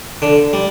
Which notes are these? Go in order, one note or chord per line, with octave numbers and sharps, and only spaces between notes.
D3
G3